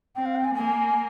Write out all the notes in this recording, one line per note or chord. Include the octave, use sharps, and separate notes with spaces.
C4 G5
F5
G5
G#5
A#3 G#5